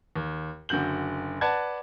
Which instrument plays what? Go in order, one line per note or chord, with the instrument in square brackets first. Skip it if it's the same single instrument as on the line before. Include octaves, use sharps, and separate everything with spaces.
[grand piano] D#2
F#1 D3 F#4 G6 F#7
B4 D5 F#5 A5 G#6